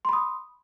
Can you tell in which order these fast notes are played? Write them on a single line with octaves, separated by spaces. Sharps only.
C6 B5 D#6